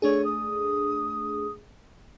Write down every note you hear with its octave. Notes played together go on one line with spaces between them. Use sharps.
A3 D4 G#4 C#5
D#6